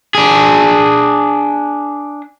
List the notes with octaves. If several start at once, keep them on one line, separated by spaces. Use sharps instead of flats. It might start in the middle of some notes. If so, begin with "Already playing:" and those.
D4 G#4